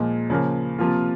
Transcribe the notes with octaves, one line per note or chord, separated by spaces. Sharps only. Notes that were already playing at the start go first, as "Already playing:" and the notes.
Already playing: A#2 F3 G#3
C#3 F3 A#3
C3 F3 A#3 F4